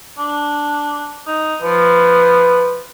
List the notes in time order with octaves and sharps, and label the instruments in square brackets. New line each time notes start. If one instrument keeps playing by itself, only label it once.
[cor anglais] D4
D#4
[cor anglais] F3 [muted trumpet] B4